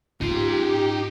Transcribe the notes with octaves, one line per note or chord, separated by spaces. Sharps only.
G#2 C#4 D#4 F4 G4 C6